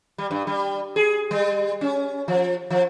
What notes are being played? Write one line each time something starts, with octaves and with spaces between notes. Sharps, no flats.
G3
G2
G3
G#4
G3
C#4
F3
F3